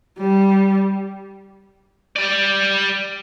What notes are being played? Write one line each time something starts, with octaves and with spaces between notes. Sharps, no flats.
G3
G3 D5